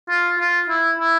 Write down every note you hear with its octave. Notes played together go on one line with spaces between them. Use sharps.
F4
F4
E4
E4